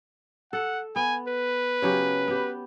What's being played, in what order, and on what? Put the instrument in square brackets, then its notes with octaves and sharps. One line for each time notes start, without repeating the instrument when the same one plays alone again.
[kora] A4 [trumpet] F#5
[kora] B3 [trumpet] G#5
[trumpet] B4
[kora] C#3 F#3 G4
B3 G4